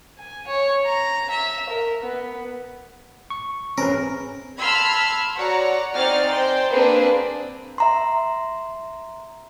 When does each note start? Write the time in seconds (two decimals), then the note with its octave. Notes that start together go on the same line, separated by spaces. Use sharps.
0.18 G#5
0.48 C#5
0.85 A#5
1.30 E5
1.69 A#4
2.02 B3
3.30 C#6
3.78 C4 C#4 G#4 A#4 B4
4.61 A5 B5 C6 E6 F6 G#6
5.38 F#4 C#5 D5 F#5 A#5
5.95 C4 D#4 D5 G#5 F6 A6
6.32 C5 G5 C6
6.71 A#3 C4 D4 G#4 B4
7.78 E5 A#5 C6